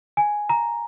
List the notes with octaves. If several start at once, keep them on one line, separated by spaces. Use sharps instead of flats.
G#5
A#5